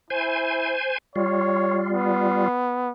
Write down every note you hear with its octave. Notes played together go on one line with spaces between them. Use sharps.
E4 C5 G#5
G3 F4 C#5
B3